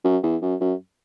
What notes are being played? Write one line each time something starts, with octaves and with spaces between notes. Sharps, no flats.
F#2
E2
F#2
F#2